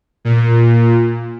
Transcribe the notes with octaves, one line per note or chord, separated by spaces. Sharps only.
A#2